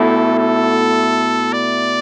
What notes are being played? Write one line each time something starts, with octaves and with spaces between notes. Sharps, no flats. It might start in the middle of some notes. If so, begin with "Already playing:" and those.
Already playing: B2 A3 E4 A4
A4
D5